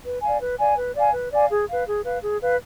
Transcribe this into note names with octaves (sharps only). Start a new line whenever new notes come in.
B4
D5 F5 G#5
B4
D5 F5 G#5
B4
D5 F5 G#5
B4
D5 F5 G#5
G#4
B4 F5
G#4
B4 F5
G#4
B4 F5